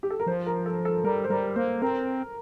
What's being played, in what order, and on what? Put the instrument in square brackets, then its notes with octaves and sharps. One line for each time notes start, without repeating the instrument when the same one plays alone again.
[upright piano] G4
A4
A#4
[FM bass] F3 [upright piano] C5
[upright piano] A#4
A4
A4
[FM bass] G3 [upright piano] A#4
[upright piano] C5
[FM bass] G3 [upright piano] A#4
[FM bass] A#3 [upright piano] C5
[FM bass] C4 [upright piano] A#4